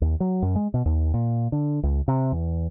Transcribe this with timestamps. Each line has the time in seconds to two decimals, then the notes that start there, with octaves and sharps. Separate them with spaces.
0.02 D#2
0.20 F#3
0.42 F#2
0.56 G#3
0.74 B2
0.86 D#2
1.14 A#2
1.52 D3
1.83 C#2
2.08 C3
2.32 E2